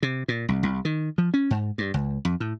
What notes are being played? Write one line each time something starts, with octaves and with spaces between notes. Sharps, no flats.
C3
A#2
C2
C2
D#3
F3
C#4
G#2
G2
C#2
F2
A2